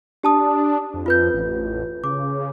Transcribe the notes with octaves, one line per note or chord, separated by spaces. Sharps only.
D4 G4 A5 D#6
F2
F4 B4 G6
A1
C#3 D6